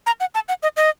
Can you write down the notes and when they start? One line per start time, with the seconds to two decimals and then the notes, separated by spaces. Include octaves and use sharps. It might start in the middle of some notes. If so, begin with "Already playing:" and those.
0.06 A#5
0.20 F#5
0.35 A5
0.49 F#5
0.63 D#5
0.77 D#5